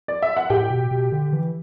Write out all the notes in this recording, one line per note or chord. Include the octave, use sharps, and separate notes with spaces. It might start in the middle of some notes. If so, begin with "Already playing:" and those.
D5
E5
F#5
A2 G4 G5
B2
B2
D3
E3